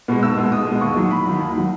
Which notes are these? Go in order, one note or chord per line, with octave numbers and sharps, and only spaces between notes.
B2 G#3
B1 E6
B2 G#3
B1 D#6
B2 G#3
D#2 C#6
D#3 F#3
D#2 B5
D#3 F#3
D#2
D#3 F#3